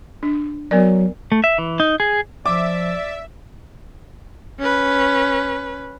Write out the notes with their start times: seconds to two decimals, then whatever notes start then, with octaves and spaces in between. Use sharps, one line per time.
0.23 D4
0.71 F#3 B3 A#4 D5
1.32 A3
1.44 E5
1.58 E3
1.80 D#4
2.00 G#4
2.46 F3 D5 E5 D6
4.59 C#4 B4